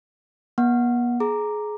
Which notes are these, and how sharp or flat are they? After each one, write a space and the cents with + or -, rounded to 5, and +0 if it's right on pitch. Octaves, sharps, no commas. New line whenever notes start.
B3 -45 F#5 -5
G#4 +25 A#5 +0 D6 +5